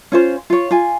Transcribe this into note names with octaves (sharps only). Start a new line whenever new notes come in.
C#4 F4 C5
F4 C#5
F4 G#5